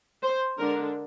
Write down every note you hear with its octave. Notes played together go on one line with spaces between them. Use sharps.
C5
D3 G#3 D4 A#4